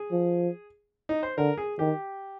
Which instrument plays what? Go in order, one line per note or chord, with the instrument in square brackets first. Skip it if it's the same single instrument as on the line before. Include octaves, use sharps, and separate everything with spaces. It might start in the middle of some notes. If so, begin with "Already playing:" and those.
Already playing: [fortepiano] G#4
[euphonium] F3
[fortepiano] D#4
C5
[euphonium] D3 [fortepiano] A#4
[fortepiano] G#4
[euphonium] D#3 [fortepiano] G4